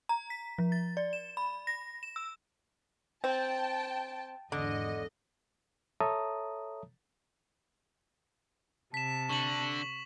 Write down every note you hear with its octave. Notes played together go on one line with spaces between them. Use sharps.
A#5
B6
F3
A6
D5
E7
B5
A#6
E7
E6
C4 G5 A5
G#1 E2 D3 D#5
A4 C#5 E5 A5 A#5 D#6
C3 A5 B6 E7
D3 C#6 F#7